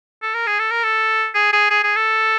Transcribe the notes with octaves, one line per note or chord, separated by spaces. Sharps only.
A4
A#4
G#4
A4
A#4
A4
G#4
G#4
G#4
G#4
A4